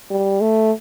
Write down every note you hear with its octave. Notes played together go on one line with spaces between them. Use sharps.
G3
A3